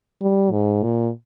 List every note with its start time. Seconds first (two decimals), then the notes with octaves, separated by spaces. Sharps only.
0.22 G3
0.52 G#2
0.83 A#2